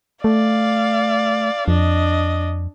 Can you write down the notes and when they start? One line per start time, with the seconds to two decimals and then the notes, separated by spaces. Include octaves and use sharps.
0.24 A3 D5 F5
1.68 F2 D4 D#5